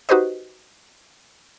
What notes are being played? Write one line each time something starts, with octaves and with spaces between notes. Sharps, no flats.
D#4 F#4 G4 B4 C5 D#5